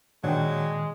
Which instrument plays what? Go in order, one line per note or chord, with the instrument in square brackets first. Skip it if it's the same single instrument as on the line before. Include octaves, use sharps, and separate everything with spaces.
[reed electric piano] A#2 D#3 [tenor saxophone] F#3 [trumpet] G#3 [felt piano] D4 G5